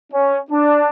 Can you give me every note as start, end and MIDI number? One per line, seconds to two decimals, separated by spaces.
0.13 0.38 61
0.51 0.90 62